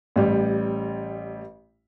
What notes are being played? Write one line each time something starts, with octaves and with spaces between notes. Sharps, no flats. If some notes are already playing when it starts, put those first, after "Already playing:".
A1 G3